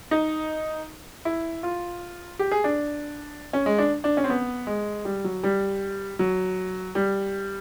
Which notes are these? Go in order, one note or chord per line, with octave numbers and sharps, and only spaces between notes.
D#4
E4
F4
G4
G#4
D4
C#4
G#3
D4
D4
C#4
C4
B3
G#3
G3
F#3
G3
F#3
G3